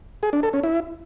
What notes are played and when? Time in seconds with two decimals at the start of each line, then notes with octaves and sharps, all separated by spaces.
0.23 G#4
0.33 D4
0.43 A4
0.53 C#4
0.63 E4